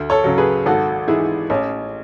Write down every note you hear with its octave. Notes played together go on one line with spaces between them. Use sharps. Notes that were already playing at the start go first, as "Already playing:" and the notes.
Already playing: D2
A4 C#5
C#3 F#3
G#4 B4
G#1 F#4 A4
G#2 E3 E4 G#4
A1 C#4